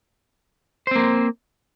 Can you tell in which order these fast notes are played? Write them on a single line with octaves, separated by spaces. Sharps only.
C5 C4 A#3